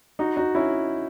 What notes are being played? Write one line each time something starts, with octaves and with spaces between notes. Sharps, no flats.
D#4 F#4
D#4 F#4
C#4 E4